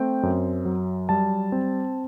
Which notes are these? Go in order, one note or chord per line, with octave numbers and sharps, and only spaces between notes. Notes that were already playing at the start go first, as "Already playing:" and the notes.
Already playing: A3 C4 G5
F#2
F#3
G3 A5
C4